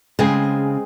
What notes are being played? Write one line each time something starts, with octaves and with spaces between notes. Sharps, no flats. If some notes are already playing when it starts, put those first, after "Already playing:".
C#3 G#3 C4 G#4